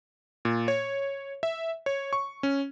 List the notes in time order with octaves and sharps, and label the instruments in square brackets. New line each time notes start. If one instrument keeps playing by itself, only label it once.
[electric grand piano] A#2
C#5
E5
C#5
C#6
C#4